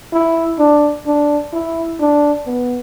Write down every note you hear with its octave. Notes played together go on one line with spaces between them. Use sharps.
E4
D4
D4
E4
D4
B3